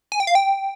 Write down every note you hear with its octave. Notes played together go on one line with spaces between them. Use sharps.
G#5
G5
F5
G5